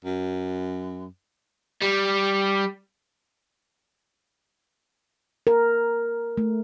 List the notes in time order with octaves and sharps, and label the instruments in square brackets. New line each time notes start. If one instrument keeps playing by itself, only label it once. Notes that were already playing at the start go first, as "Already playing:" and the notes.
[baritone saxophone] F#2
[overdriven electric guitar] G3
[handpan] A#4
A3